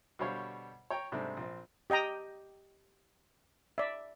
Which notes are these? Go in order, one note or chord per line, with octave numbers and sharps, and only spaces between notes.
B2 D3 G3 C5 C#5 F5
C#5 G5 A#5
G#2 C3 G3 A3 C4 D4
A#1 C4
G4 D#5 G5 A#5 D#6
D5 E5